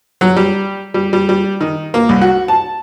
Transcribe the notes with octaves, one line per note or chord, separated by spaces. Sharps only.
F#3
G3
G3
G3
G3
D#3
A#3
C2
F#4
A5